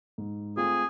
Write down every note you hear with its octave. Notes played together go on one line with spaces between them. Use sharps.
G#2
A3 C4 F4 G#4